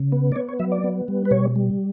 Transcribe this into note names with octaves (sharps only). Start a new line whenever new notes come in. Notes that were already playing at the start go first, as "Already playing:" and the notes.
Already playing: C#3
B3
D5
B3 C#5
C#5
F#3 E5
D5
B3
G3
B4
B2 C#5
G3